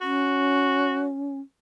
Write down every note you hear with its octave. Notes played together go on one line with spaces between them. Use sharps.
C#4 F#4